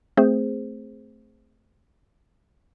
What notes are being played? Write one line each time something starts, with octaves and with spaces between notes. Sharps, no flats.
A3 C4 G#4 C5